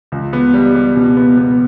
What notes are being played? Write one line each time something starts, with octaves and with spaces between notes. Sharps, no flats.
C#2
B3
G3
G3
B2
B3
B3